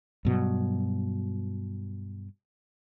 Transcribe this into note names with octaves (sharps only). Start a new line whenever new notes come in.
G2 B2 F#3